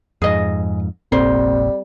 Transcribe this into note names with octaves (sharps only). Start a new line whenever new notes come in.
F2 G#2 G#4 D#5
F1 A#1 A#2 G3 C4 C5